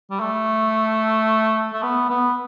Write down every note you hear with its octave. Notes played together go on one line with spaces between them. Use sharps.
G3
A3
A3
B3
B3